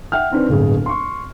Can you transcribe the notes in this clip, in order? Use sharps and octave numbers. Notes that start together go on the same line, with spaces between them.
E5 F#5 G5 F6
D#3 C4 D4 B4
D1 G1 G#4
C6 C#6